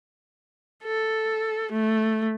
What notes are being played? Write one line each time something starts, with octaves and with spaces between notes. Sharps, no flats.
A4
A3